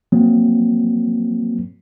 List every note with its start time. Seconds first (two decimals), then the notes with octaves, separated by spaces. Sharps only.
0.12 F#3 A#3 C4